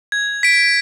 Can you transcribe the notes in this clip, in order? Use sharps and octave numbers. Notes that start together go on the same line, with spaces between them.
G#6
B6 D7